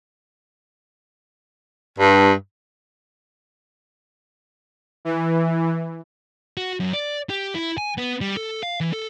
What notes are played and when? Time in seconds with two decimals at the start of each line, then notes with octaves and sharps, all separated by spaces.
1.99 G2
5.05 E3
6.57 F#4
6.80 F#2
6.93 D5
7.30 G4
7.55 E4
7.78 G#5
7.98 B3
8.21 G3
8.37 A4
8.63 F5
8.81 E3
8.93 A4